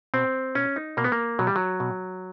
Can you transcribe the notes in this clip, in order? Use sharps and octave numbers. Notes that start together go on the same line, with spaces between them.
B2 C4
B2 C#4
D#4
B2 A#3
B3
A#3
B2 F#3
G3
F#3
B2